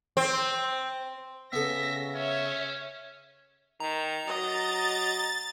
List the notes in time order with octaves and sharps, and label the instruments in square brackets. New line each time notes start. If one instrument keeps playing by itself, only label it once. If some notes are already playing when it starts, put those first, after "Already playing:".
[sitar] C4
[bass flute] C#3 [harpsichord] B3 A4 [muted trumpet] E5 [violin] A#6
[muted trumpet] C#4 [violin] C#5 E5
[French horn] D#3 [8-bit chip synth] A#5
[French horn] F#3 [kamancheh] D#5 [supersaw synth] A6